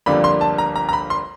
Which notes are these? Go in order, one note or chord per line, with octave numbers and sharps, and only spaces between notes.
G1 F2 D3 G3 A#3 B5
C6
A5
A#5
A#5
A#5
B5
C6